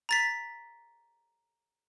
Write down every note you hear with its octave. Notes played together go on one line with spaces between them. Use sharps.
A#5 A6 B6